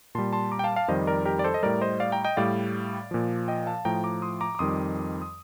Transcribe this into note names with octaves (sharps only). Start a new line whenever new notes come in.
A#2 G3 A5 C6
A5 C6
A#5 D6
G5
F5 A5
F5 A5
F2 D#3 G3 C5 D#5
A#4 D5
G4 A#4
D5
A4 C5
D#5
A2 G3 A#4 D5
C5 D#5
D5 F5
G5 A#5
D#5 G5
A2 G3 D5 F5
A#2 F3
D#5 G5
F5 A5
A2 F3 G5 A#5
A#5 D6
C6 D#6
A#5 D6
D6
F2 D#3 G3 C6 D#6
D#6